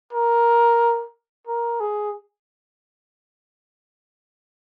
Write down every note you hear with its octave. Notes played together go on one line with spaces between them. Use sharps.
A#4
A#4
G#4